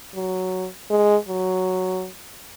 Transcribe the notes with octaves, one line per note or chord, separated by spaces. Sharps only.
F#3
G#3
F#3